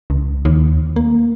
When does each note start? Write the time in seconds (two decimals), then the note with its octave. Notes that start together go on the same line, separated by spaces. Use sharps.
0.10 C#2
0.45 D#2
0.96 A#3